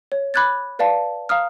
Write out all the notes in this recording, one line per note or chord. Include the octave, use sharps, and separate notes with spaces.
C#5
B5 D6 F#6 G#6 A6
B4 D5 F5 A5
F5 A#5 D#6 F6